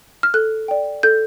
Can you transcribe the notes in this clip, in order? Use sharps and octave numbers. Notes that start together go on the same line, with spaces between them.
F6
A4 F#6
D5 G5
A4 G6